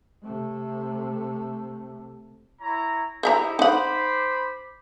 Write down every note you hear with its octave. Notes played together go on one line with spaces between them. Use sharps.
C3 A3
E4 C#5 A#5
D#4 E4 G4 C5 E5 A#5
D#4 C5 F#5 B5 D6